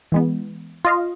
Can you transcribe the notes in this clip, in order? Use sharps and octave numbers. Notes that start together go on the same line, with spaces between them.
E3 G#3 B3
F4 D#5 F5